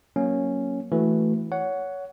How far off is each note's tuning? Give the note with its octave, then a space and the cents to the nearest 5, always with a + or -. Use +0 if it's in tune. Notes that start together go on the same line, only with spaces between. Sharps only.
F#3 +0 A#3 +15 C#4 +0
E3 +0 A3 +0 F#4 +0
C#5 +20 F#5 +0